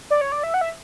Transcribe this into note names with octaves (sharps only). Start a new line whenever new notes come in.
D5
C#5
D5
E5
F#5
E5